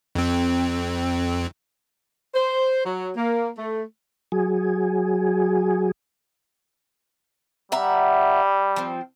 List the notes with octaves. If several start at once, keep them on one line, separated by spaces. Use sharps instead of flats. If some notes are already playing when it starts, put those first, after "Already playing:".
F2 C4
C5
F#3
A#3
A3
F#3 G#4
G3 E5 F#5 A#5
F3 C4